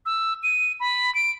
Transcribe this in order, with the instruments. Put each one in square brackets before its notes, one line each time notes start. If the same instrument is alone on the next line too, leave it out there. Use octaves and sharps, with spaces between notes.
[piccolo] E6
D#7
B5
D7